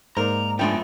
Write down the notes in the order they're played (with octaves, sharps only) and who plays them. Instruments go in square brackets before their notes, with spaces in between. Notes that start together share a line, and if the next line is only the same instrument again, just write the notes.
[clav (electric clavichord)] G#2 A#3 D5 [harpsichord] A#4 [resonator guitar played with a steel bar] C5 [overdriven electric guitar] A#5
[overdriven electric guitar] F#2 F4 [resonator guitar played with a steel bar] G#3 D4 G5 [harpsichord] A3 B3